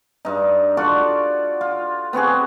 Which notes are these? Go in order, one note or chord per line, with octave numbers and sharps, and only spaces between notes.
G2 D#4
F4 F#4 A4 D5
F4
B3 C4 F#4 G#4